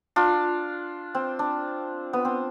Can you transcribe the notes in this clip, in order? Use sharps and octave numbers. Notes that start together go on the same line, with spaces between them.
D4 F4
C4
D4
B3
C4